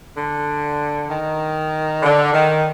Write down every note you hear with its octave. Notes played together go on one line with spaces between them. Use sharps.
D3
D#3
D3
D#3